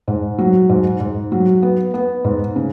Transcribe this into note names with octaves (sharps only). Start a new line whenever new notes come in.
G#2
F#3
G#2
G#2
F#3
B3
B3
G#2
C#3